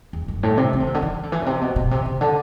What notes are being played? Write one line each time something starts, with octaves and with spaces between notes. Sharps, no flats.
E2
F#2
A2
C3
E3
D3
C3
D3
E3
D3
E3
B2
C3
B2
B2
C3
C3
D3